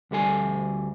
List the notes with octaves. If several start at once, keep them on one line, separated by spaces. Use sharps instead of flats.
D2 G3 A4 G#5